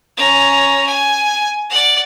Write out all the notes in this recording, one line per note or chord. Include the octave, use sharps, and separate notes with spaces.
C#4 A#5
G#5
D5 F#5